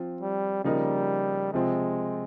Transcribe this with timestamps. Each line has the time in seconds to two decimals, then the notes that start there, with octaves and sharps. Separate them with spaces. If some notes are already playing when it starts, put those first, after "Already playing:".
Already playing: F3 C4 F4
0.21 G3
0.64 C#3 F3 G3 A#3 D#4 A#4
1.54 C3 F3 G#3 C4 F4